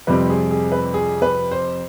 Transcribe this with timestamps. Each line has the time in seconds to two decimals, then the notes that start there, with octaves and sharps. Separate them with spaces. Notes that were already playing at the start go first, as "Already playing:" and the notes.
0.07 F2 C3 G3 C4 B4
0.30 G#4
0.51 G#4
0.72 B4
0.94 G#4
1.22 B4
1.51 C5